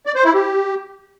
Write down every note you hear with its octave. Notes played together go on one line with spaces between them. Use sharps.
D5
C5
E4
G4